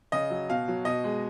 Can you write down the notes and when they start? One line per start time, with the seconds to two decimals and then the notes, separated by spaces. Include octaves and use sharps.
0.12 C#3 D#5
0.30 F#3
0.49 B2 F5
0.68 F#3
0.85 B2 D#5
1.04 G#3